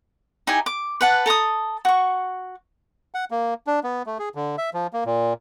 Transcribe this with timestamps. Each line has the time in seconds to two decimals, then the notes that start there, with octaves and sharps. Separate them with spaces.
0.47 D#4 E4 G4 G#5
0.66 D6
1.01 B4 F#5 A5
1.26 A4 A#5 C#6 D#6
1.85 F#4 C#6
3.14 F#5
3.31 A#3
3.67 D4
3.84 B3
4.06 A3
4.19 G#4
4.35 D3
4.58 E5
4.74 F3
4.93 A#3
5.05 A#2